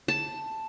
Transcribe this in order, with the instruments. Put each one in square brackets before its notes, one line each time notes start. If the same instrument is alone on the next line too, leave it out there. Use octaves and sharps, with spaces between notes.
[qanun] A5